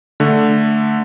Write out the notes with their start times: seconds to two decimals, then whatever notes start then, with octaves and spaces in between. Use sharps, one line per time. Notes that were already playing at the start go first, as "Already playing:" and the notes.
0.20 D3 A3